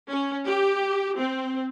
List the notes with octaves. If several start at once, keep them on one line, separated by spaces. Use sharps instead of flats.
C#4
G4
C4